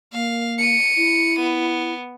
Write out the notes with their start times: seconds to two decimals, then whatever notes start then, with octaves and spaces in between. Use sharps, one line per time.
0.13 A#3 F5
0.59 C#7 D#7
0.97 E4
1.40 B3